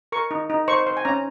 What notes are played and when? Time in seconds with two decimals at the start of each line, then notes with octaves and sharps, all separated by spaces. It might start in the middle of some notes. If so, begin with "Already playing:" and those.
0.12 A#4 C#6
0.31 D#4
0.50 D#4
0.68 C5 C#6
0.86 C5 C6
0.97 G#5
1.05 C#4 A#5